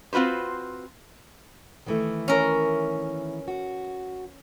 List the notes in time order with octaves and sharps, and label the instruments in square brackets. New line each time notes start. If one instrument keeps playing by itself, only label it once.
[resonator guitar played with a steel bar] C4 F4 F#4 B4 C5
[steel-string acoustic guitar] D#3 E3 A3
[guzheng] C#4 A#4
[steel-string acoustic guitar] F#4